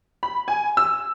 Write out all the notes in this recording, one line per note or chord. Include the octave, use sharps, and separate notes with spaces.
B5
G#5
E6